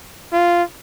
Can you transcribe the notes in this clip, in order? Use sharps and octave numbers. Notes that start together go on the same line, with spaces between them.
F4